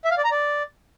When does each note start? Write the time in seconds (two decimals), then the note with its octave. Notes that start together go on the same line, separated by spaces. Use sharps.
0.04 E5
0.11 F5
0.18 D5
0.24 A#5
0.31 D5